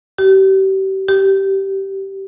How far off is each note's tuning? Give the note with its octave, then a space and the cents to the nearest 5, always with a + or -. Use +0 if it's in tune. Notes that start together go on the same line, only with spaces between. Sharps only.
G4 -35
G4 -15